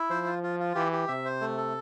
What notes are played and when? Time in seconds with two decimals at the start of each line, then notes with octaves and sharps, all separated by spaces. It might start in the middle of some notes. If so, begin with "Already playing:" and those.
Already playing: E4
0.10 F3 C5
0.26 F4
0.43 F4
0.60 F4
0.75 E3 G4
0.92 G4
1.08 C3 E5
1.25 C5
1.41 A3
1.57 A4